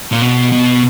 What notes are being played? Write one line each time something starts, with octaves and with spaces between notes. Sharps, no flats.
A#2
B2
B2